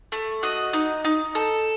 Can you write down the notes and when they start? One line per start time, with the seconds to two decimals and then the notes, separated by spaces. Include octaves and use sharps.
0.12 A3
0.43 F#4 D#5
0.73 D#4
1.05 D#4
1.35 A4